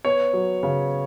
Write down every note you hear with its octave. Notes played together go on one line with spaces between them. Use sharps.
B3 C#5
F#3
C#3